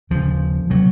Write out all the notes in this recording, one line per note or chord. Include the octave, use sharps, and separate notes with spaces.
D#2 C#3 F3
C3 F#3